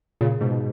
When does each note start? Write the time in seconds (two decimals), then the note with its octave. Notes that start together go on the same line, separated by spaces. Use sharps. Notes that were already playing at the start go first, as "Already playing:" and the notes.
0.21 A#2 C#3
0.41 G#2 B2